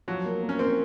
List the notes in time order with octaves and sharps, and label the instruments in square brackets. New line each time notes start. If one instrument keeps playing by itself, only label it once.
[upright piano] F3 [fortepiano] F#3
[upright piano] A#3
A#3
[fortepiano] C#4
[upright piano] A#3 [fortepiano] C4